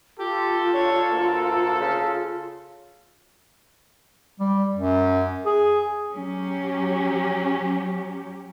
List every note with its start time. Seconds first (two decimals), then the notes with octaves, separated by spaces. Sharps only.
0.19 F4 G4 A4
0.74 D4 C#5
1.11 D2 A#3
1.80 C#3
4.40 G3
4.75 F#2
5.46 G#4
6.14 F#3 C#4 G4